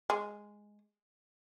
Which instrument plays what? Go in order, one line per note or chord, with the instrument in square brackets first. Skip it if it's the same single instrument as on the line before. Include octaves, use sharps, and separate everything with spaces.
[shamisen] G#3